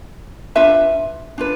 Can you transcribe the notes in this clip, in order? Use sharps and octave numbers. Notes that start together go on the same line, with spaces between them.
D4 F4 B4 E5
D4 F4 B4